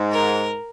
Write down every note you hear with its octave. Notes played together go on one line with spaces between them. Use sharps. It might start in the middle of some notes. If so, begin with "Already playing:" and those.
Already playing: G#2
A#4